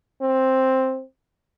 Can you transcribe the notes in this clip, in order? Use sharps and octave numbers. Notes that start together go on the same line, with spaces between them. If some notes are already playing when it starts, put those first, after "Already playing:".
C4